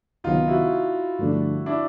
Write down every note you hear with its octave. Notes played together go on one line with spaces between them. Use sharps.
C#2 C3 D#3 F#3 B3 D#4 F4
E4 F#4
G2 D3 F3 A3 D4
D4 E4